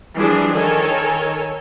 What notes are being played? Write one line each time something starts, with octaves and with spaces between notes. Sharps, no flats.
E3 F3 G3 D4 G#4
D#3 A4 C#5 G#5